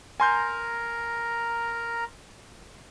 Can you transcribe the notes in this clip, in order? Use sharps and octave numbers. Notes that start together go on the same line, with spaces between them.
A#4 G#5 A#5 C6 G6